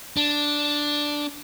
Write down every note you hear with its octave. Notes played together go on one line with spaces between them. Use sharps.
D4